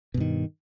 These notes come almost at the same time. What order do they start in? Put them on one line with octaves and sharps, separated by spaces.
B2 G2 D#3